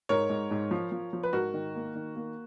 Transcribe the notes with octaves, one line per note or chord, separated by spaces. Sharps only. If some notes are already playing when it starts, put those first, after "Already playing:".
G#2 A#4 C#5
G#2
G#2
F3
F3
F3
B4
G#2 F#4 A#4
D#3
A#3
D#3
A#3